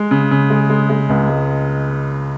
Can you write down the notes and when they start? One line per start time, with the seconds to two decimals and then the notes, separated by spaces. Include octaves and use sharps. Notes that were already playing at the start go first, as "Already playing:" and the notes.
Already playing: G#3
0.11 C#3
0.31 C#3
0.50 G#3
0.70 G#3
0.90 G#3
1.09 C#2
1.29 G#3